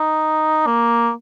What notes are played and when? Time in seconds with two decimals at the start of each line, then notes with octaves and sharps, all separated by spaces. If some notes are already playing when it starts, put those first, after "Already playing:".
Already playing: D#4
0.67 A#3